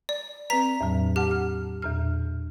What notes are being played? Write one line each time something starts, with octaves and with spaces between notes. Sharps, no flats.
D5
C4 B4 A#5 B6
E2 A2 F#3
G4 F#5 A5 F6
F6
E2 A#2 F6